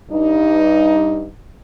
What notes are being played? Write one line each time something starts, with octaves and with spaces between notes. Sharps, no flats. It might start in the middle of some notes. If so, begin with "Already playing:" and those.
G2 D#4